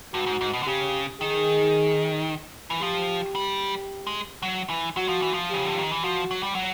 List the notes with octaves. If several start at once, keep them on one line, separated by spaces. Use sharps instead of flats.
G2 F#4
G#2
G#2
B2
D3
C#3 G4
D#3 G#4
E3
F3 G4
G3
G#3
F#3
E3
F#3 F#4
F3
E3
F3
C#3 G4
D3
D#3
E3
F3 F#4
F#3
G3
F#3